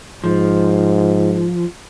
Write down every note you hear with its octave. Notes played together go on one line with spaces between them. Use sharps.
G#2 F3